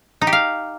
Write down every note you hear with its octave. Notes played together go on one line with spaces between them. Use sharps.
D#4
G4
F5